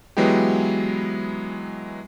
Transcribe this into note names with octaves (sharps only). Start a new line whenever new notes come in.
E3 F#3 G#3 B3 E4 G4